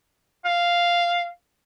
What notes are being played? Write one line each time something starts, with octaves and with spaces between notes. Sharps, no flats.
F5